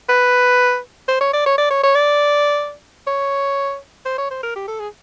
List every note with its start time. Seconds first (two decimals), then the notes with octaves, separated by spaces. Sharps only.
0.09 B4
1.08 C5
1.21 C#5
1.33 D5
1.46 C#5
1.58 D5
1.70 C#5
1.83 C#5
1.95 D5
3.07 C#5
4.06 C5
4.18 C#5
4.31 C5
4.43 A#4
4.56 G4
4.68 A4
4.80 G#4